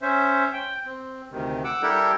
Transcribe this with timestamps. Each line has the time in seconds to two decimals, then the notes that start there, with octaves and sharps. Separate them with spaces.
0.02 C#4 C5 E5
0.53 G5
0.86 C4
1.31 D2 C3 D#3
1.64 F#5 D6 E6
1.82 G3 D4 E4 G4 A4 A#4